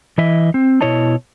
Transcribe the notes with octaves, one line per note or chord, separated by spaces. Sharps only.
E3 E4 D#5 E5
C4
B2 B3 E4 C#5 D#5 A5